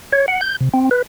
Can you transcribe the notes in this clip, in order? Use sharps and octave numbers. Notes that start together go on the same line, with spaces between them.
C#5
F#5
G6
C3
C4
B4